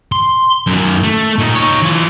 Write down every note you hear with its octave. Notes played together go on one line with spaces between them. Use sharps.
C6
F#2 D#3
A3
A#2 D#4
D#4 C#5
E3 F4